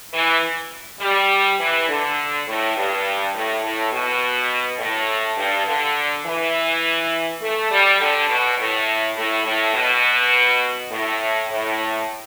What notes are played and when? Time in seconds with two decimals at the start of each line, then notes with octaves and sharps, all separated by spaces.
0.13 E3
1.01 G3
1.60 E3
1.89 D3
2.47 A2
2.76 G2
3.34 A2
3.63 A2
3.92 B2
4.79 A2
5.38 G2
5.66 D3
6.26 E3
7.41 A3
7.71 G3
8.00 D3
8.28 B2
8.58 A2
9.17 A2
9.45 A2
9.74 B2
10.91 A2
11.50 A2